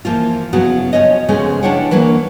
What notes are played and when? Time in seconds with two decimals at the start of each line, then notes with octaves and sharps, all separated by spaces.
0.05 E3 F3 A#3 F4
0.53 C#3 F#3 B3 E4 F#4
0.93 F3 C#4 C#5 D#5
1.28 C#3 F3 G#3 A3 B3 C#4
1.63 D4 E4 F4 C#5 F#5 G5
1.91 E3 F#3 A#3 D4